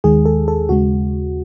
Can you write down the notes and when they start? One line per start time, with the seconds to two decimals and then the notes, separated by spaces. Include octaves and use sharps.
0.04 D#2 D#3 G#3 G#4
0.25 A4
0.48 A4
0.69 D#2 C#3 G#3 F#4